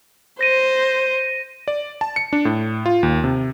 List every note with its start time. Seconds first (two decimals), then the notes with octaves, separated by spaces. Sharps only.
0.41 C5 A#6 D#7
1.68 D5
2.01 A5
2.16 C#7
2.33 D4
2.45 A2
2.86 F4
3.03 D#2
3.24 C3